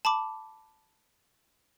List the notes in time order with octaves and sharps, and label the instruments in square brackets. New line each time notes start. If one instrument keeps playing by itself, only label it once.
[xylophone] A5 B5 D6